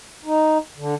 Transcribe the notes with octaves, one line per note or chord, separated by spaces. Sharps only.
D#4
D3